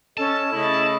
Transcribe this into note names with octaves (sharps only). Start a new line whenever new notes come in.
C#4 A4 D#5 A5
C#3 A3 E4 D#5 B5